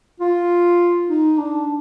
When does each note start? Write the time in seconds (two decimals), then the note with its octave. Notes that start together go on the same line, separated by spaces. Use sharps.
0.20 F4
1.09 D#4
1.38 D4